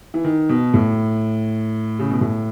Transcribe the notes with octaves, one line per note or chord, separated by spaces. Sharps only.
E3
D#3
B2
A2
C#3
B2
A2